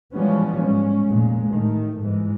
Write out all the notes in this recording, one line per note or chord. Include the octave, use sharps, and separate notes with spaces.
E3 F3 G3 G#3 B3 C#4
G#2 G#3 C#4
F1 A#2 G#3
A1 D#3 A3
G1 G#2 E3 G#3